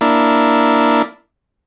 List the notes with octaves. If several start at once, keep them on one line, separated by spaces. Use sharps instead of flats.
A#3 D4 E4